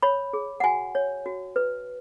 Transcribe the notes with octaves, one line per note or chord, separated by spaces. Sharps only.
C#5 B5
G#4
F#5
F#4 G#5
C#5
F#4
B4